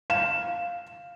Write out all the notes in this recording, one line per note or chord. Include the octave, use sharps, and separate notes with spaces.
F5 E7